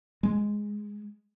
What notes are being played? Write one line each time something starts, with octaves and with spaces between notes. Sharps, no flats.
G#3